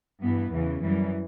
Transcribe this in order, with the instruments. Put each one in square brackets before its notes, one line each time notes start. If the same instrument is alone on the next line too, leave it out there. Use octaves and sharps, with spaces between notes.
[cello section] G2 E3 B3
E2 C#3 E3
F#2 E3 G3